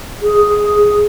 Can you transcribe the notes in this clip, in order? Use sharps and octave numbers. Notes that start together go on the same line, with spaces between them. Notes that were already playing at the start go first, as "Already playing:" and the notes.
G#4